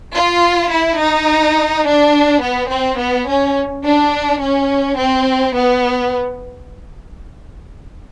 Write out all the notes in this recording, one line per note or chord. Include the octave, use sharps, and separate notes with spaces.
F4
E4
D#4
D4
B3
C4
B3
C#4
D4
C#4
C4
B3